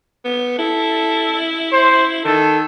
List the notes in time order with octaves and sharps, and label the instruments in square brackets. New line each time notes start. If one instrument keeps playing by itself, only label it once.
[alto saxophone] B3
[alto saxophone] E4 [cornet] A4
[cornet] C5
[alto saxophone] D#3 [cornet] A4